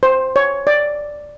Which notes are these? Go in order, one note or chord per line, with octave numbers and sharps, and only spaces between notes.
C5
C#5
D5